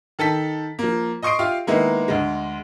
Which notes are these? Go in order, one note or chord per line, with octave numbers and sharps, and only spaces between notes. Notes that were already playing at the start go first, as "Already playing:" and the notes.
D#3 A4 A5 B6
F3 A#3
D#5 C6 C#6 D#6 C7 D7
F4 G4 E5 F5
D#3 G#3 A#3 B3 E4
D2 G#3